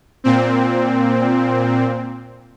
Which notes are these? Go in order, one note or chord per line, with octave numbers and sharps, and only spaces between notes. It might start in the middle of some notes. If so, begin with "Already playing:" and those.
A#2 C4